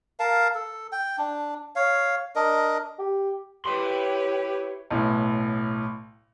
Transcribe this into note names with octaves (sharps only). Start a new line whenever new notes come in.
A#4 F5 A5
A4
G5
D4
C#5 F5
D4 A#4 D#5
G4
E4 G4 B4 C#5 G5 C6
B1 A2